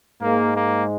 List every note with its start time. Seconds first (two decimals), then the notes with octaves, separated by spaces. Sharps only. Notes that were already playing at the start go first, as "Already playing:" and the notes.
0.21 G#2 G#3 A#3
0.55 A#3